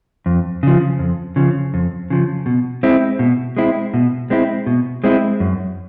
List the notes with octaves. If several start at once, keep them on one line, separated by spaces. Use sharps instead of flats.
F2
C#3 F3
F2
C#3 F3
F2
C#3 F3
B2
G#3 C4 E4
B2
G#3 C4 E4
B2
G#3 C4 E4
B2
G#3 C4 E4
F#2